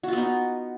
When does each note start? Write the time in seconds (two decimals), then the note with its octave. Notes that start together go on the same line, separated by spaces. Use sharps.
0.03 F#4
0.08 F4
0.13 B3
0.17 D#4